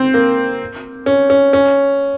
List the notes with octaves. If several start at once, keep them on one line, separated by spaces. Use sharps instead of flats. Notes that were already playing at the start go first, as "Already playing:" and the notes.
Already playing: C4
A#3
C#4
C#4
C#4